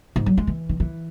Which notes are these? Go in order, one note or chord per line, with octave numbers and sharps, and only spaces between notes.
G#2
F#3
G#3
E3
D#3
E3